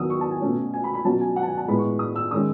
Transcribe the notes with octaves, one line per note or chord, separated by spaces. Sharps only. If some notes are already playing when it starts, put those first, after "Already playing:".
Already playing: E2 D#3 F#3 B3 D#6 E6
C#6
A5
G#5
B2 A3 C#4
G#5
B5
B5
B2 F#3 C#4 A5
G#5
F#5
A5
G#5
A5
A2 G#3 B3 B5
C#6
D#6
E6
D#3 G#3 C#4 D#6